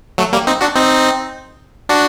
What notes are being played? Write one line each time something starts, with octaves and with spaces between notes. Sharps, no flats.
F#3 A3
G3 A#3
C4 D#4
D4 F#4
C4 D#4
D4 F#4